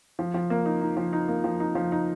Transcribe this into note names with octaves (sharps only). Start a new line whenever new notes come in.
F3
F3
A#3
D#4
D#4
F3
D#4
A#3
F3
D#4
F3
D#4